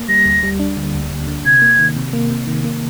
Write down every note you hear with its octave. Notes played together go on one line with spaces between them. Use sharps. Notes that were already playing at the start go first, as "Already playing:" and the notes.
Already playing: A#3
G3 A#6
D2
G3
D4
D3
D2
D2
D3
C3 G#6
A#3
D#3
C3
A#3
C3
D#3
A#3